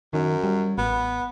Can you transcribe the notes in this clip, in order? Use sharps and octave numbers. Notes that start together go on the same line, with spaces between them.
F#2 D#3
G3
A1 B3